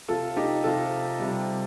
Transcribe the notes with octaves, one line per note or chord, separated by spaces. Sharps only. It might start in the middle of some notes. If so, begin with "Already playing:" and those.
C3 F3 F4 A4
D#4 G4
C3 F3 F4 A4
C3 G3